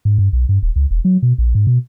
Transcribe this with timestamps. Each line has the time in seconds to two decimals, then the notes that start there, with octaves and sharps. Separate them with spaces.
0.05 G#2
0.18 G2
0.33 B1
0.49 G2
0.63 D#1
0.76 C#2
0.91 E1
1.05 F#3
1.23 B2
1.38 A#1
1.55 G#2
1.67 B2